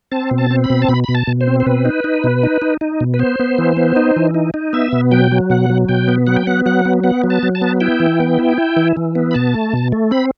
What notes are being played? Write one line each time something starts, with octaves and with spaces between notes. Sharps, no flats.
C4 A5
B2
A5
C4
B5
B2
A5
B2 B5
B2 B5
A5
B2
C5
C4
C5
B2 B4
D#4
D#4
B2
D#4
D#4
D#4
B2
B4
B3 C5
B3
E3
B3
D#4
E3
D#4
D#4
B3 E5
B2
F#3 G5
F#3
B2 F#5
F#3
B2 G5
B3
F#3 F#5
G5
B3 F#5
F#3 F#5
B3
B3 F#5
F#3
A5
F#3
A5
B3
E4 G5
E3
B3
E4
E4
E3
E3
B3
B5
B2 A5
A3
B2
A3
C4 B5